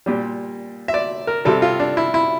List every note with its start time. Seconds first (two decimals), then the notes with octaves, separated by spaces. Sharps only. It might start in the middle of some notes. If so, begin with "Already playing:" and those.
0.06 A#2 G3 G4
0.88 E5
0.94 D5
1.27 A#4
1.45 C3 G3 A4
1.62 F4
1.80 D4
1.97 E4
2.14 E4